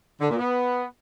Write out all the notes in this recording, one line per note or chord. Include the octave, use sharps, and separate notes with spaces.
D3
A#2
B3